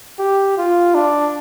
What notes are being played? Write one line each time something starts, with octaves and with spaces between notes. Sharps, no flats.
G4
F4
D4